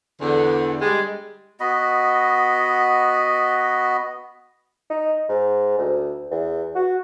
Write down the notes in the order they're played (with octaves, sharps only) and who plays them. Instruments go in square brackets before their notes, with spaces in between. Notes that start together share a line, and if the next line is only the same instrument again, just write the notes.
[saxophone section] E2 D3
G3 G#3
[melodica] B3 F#4 D#5 B5
[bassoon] D#4
G#2
D2
E2
F#4